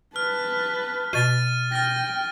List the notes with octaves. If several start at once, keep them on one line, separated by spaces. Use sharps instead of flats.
B4 A5 F6
B2 F6 A6 D#7
G5 F6 A6 A#6